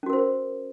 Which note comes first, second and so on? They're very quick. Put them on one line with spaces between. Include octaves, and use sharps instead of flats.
C#4 F#4 A#4 C5